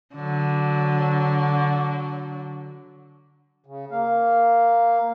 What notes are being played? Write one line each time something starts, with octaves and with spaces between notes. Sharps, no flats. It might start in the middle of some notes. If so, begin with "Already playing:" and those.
D3 F#3
C#3
A#3 F5